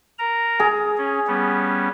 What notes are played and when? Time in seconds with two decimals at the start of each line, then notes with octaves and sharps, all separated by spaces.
0.19 A#4 A#5
0.60 G#4
0.98 C#4
1.27 G3 B3 C#4